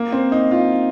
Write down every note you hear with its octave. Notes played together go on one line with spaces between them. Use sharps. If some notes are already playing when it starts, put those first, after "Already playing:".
Already playing: A#3
C4
D#4
F4